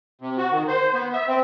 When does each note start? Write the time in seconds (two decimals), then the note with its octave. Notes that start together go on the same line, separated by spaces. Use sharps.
0.21 C3
0.38 F#4
0.52 D#3
0.68 C5
0.94 B3
1.13 E5
1.28 C4